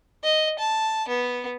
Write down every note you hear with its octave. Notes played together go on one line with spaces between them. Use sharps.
D#5
A5
B3